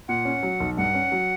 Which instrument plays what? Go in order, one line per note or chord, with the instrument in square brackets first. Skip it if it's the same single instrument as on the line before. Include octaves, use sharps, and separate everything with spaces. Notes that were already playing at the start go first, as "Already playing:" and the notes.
[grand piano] A#2 [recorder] F#5
[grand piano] C#4
F#3
B1
[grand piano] G2 [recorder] F#5
[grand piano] C#4
F#3